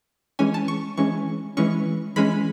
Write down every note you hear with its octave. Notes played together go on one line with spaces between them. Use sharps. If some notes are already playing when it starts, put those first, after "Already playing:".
E3 G#3 C#4 G#5
A5
C#6
E3 G#3 C#4 C#6
E3 G#3 C#4 C#6
E3 G#3 C#4 B5